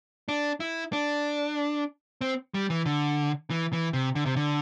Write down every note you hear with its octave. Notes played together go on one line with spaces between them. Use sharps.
D4
E4
D4
C4
G3
E3
D3
E3
E3
C3
D3
C3
D3